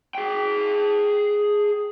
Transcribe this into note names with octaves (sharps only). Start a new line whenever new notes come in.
G#4 G5